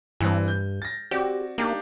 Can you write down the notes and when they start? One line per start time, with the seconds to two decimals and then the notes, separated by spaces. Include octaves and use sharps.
0.21 G2 E3 C4
0.48 G6
0.82 A6 A#6
1.11 C4 F#4 G4 D5
1.58 A#3 D4 D#4 G4